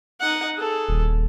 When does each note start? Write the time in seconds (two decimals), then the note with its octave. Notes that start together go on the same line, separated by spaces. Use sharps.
0.20 D#4 F#5
0.56 G#4 A4
0.88 D#1